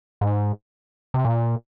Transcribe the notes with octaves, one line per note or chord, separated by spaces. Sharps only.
G#2
C3
A#2